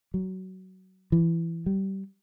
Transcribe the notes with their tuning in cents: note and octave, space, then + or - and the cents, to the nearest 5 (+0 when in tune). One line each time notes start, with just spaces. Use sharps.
F#3 +20
E3 +15
G3 -20